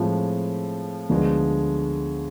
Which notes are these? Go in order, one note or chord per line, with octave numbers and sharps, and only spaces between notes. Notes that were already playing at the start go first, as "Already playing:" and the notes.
Already playing: A2 F3 G#3 C4
D2 D3 F3 G#3 B3